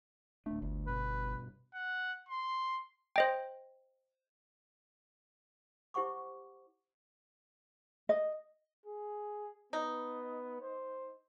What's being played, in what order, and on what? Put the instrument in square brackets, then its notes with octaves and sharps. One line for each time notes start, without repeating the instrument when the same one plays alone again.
[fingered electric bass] D1 D4 [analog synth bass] A3
[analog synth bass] G1 [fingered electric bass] D2
[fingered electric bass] G2 B2 [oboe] B4
[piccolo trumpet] F#5
C6
[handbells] C5 D#5 G5
[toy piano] E4 G4 C5 F#5 C#6 D6
[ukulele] D#5
[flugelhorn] G#4
[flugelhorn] B3 [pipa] D#4
[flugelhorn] C5